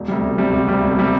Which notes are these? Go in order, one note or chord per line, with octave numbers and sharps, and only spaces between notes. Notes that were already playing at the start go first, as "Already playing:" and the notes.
Already playing: E1
D2 C3 G3
E1
D2 C3 G3
E1
D2 C3 G3
E1
C3 G3